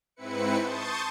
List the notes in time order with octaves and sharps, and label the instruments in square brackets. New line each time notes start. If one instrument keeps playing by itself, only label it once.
[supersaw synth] G#2 C4 E4 B4 C#7
A5 C6 C#6 D#6 G6 A6